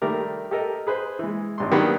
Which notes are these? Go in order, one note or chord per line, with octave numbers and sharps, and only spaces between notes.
D#3 G3 A3 A#4 D6
G4 A4 A#4 D#5
G#4 B4 C5
E3 G#3
G#1 G2 C6
D#3 F#3 G3 A#3 B3 D4